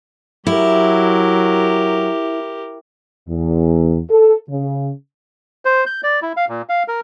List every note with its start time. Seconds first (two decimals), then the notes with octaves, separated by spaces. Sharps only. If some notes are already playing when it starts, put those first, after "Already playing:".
0.47 F#3 E4 G4 A#4
3.29 E2
4.10 A4
4.50 C#3
5.65 C5
5.86 G6
6.03 D5
6.22 E4
6.37 F5
6.49 A#2
6.69 F5
6.88 A#4